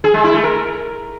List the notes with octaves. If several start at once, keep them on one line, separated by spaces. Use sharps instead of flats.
G#4
G#3
E4
A3
A#4